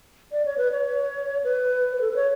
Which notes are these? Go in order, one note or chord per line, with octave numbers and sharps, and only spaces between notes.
D5
C#5
B4
C#5
B4
B4
A4
B4
C#5